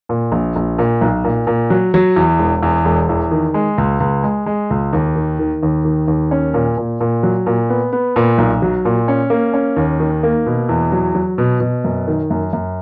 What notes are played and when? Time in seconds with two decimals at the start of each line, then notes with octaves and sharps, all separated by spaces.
0.09 A#2
0.32 A#1
0.56 A#1
0.78 A#2
1.01 B1
1.24 A#2
1.47 A#2
1.70 F#3
1.94 F#3
2.16 E2
2.39 E1
2.63 E2
2.85 E1
3.09 E2
3.31 D#3
3.54 G#3
3.78 C#2
4.00 C#2
4.23 G#3
4.46 G#3
4.70 C#2
4.93 D#2
5.16 D#3
5.39 D#3
5.63 D#2
5.85 D#3
6.08 D#2
6.31 C#4
6.54 A#2
6.77 A#2
7.01 A#2
7.23 F#3
7.46 A#2
7.70 B3
7.93 B3
8.16 A#2
8.38 B1
8.62 F#3
8.85 A#2
9.08 C#4
9.30 A#3
9.54 C#4
9.77 D#2
10.00 D#3
10.23 A#3
10.46 B2
10.69 E2
10.92 F#3
11.15 F#3
11.38 B2
11.60 B2
11.84 F#2
12.08 D#3
12.30 F#2
12.53 F#2